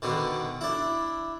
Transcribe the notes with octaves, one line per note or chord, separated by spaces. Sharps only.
B2 D3 D#3
D4 E4